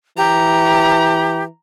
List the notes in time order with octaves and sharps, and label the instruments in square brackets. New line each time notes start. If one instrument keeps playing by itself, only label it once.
[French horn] E3 [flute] G4 [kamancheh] A#5